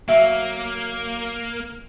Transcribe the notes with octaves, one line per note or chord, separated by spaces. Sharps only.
F#3 A#3 E5